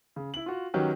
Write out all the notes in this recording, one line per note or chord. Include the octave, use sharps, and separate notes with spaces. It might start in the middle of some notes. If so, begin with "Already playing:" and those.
C#3
E4 F#7
F4 F#4
D#3 F#3 C#4 F#4 G4 B4